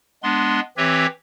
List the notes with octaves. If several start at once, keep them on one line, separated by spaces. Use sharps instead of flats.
G#3 B3 D4 C6
E3 C4 G4 B4 C#5 E5